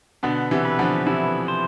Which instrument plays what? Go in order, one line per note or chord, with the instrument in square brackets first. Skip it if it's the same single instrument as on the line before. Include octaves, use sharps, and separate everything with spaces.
[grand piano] B2 D3 [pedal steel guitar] B3
[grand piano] C3 E3
[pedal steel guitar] B4
[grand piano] D3 F3
[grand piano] C3 E3 [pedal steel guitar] E4
[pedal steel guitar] C5